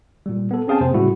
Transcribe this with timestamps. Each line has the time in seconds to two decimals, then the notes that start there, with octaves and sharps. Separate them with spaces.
0.26 A#2 G3
0.51 B3 A4
0.68 C4 C#4 G#4 F5 G5 A5
0.80 F2 C3 A#3 C5
0.94 A2 C#3 G3 A3 E4 F#4